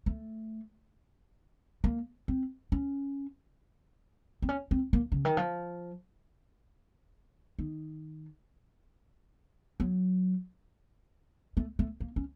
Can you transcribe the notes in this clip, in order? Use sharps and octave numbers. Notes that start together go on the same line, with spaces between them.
A3
A#3
C4
C#4
C4
C#4
C4
A#3
C#3
D#3
F3
D#3
F#3
A3
A3
A#3
C#4